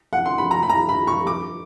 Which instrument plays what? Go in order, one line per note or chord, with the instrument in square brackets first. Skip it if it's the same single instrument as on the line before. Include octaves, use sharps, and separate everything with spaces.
[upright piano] F#5
C6
B5
A#5
B5
A#5
B5
C#6
D6